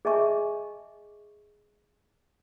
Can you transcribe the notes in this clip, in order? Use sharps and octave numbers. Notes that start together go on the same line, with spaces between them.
G#4 D#5 E5 G#5 A5 C#6